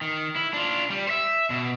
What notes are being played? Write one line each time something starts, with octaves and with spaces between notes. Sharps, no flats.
D#3
E4
D4 F4
G3
C5 E5
B2